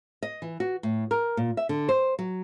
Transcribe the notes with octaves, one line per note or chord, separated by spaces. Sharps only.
D#5
E3
F#4
A2
A#4
A#2
E5
D3
C5
F#3